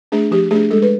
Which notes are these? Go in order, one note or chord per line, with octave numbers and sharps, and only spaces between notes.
A3 D4 G#4
F3 G4
A3 D4 G#4
G#3 A4
B4